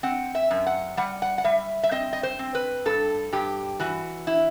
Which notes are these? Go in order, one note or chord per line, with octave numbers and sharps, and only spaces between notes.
C4 F#5
E5
F#2
F#5
G3 F#5
F#5
F#5
G3 E5
E5
C4 D#5
D#5
C5
C4
B4
G2 A4
G2 G4
E3 F#4
E4